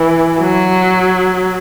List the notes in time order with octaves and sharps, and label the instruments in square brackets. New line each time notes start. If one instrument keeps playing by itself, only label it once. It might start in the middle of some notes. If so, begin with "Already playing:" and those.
Already playing: [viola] E3
F#3